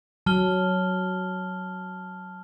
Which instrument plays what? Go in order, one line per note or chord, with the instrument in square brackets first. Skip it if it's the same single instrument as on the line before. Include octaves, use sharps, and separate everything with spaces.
[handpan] F#3 [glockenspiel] A5 F6 G7